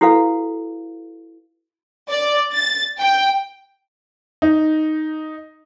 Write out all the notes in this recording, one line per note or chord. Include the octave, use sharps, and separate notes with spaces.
E4 F#4 A4 B4 F5
D5
A6
G5
D#4